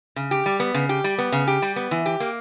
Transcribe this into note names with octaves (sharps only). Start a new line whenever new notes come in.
C#3
G4
G3
B3
C#3
G4
G3
B3
C#3
G4
G3
B3
E3
G4
A#3